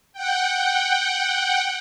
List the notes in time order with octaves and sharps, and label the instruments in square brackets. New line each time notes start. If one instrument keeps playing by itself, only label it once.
[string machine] F#5 G5